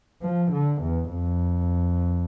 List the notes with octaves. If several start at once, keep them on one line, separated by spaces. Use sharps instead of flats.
F3
D3
E2
F2